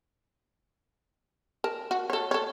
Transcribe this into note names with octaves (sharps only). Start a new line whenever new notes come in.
A#4 A5
F#4
A4 C#5
A4 C#5